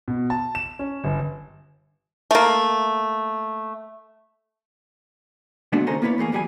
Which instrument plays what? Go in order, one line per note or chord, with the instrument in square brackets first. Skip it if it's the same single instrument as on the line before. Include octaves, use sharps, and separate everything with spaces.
[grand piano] B2
A5
E7
C#4
G1
[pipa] A3 A#3
[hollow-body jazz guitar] A#2 G#3 A3 B3 D4 F#4
D#2 C#3 A4 C5 G#5 A#5
A#3 B3 E4 B4 C#5 D5
E2 A3 A#3 G#4
E2 F#3 G3 G4 G#5